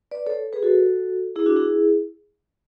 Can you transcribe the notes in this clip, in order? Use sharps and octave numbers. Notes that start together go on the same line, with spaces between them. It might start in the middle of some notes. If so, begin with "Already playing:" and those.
B4 D5
A4 C#5
G#4 B4
F#4 A4
E4 G#4
D4 F#4
E4 G#4